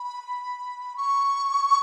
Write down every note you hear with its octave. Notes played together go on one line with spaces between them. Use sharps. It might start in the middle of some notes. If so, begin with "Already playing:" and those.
Already playing: B5
C#6